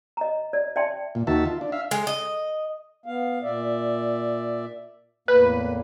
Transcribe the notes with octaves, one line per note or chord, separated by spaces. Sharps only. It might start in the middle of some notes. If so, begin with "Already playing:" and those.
D#5 A#5
D5
D5 E5 G5 A5 C6
A#2
D#2 D#3 F#4 E5 A5
F4
D4
E5 F5
G#3
D#5
B3 F5
A#2 D5 E5
E2 A2 A#3 B4